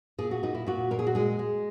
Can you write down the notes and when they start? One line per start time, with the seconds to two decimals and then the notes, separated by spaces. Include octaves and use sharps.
0.18 A#2 G#4
0.31 F#4
0.43 A#2 D#4
0.55 E4
0.67 A#2 F#4
0.91 A#2 A#4
0.99 G#4
1.07 F#4
1.15 G#3 G#4
1.39 G#3